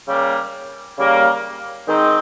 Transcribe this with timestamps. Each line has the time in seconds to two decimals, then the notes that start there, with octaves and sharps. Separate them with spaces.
0.06 C#3 G3 A#3
0.97 C#3 G3 A#3
1.87 D#3 G#3 C4 D#4